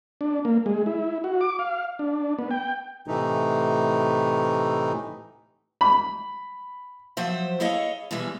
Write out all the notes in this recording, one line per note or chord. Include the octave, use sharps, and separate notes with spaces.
D4
A#3
G#3
E4
F#4
D6
F5
D4
B3
G5
A2 C3 E3 A3 D#4
B5
F3 F#3 C5 E5
E4 G#4 A4 C#5 D#5 F5
B2 E3 G3 G#3 E5